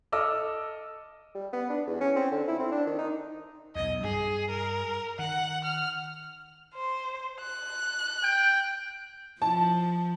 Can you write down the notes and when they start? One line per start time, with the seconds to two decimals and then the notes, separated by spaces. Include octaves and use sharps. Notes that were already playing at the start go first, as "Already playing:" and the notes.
0.12 A4 D#5 D6 E6 F6
1.35 G3
1.53 B3
1.70 D4
1.87 E2
2.01 C#4
2.16 C4
2.31 D3
2.48 E4
2.59 C4
2.72 D4
2.86 D#3
2.99 D#4
3.75 B1 E2 D#5
4.04 G2 G3 G#4
4.50 A#4
5.19 D#3 F#5
5.64 F6
6.75 C5
7.40 F#6
8.24 G5
9.42 F3 A5